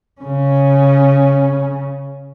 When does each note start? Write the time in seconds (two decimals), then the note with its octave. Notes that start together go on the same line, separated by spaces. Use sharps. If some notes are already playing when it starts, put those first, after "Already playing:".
0.21 C#3 C#4